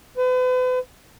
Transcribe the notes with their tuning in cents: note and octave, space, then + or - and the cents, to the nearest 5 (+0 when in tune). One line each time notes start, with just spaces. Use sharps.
B4 +40